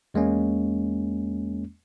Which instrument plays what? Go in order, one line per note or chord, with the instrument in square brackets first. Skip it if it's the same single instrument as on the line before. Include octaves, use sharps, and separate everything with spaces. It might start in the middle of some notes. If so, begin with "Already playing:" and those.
[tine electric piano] E2 G#3 A#3 C#4